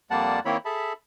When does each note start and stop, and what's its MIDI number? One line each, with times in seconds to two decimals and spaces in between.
0.10 0.40 41
0.10 0.40 55
0.10 0.40 58
0.10 0.40 74
0.10 0.40 78
0.10 0.40 81
0.45 0.57 51
0.45 0.57 58
0.45 0.57 60
0.45 0.57 64
0.45 0.57 73
0.45 0.57 83
0.65 0.93 68
0.65 0.93 69
0.65 0.93 76
0.65 0.93 81
0.65 0.93 83